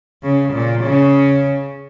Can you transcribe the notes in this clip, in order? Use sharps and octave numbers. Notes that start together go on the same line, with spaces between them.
C#3
A#2
C#3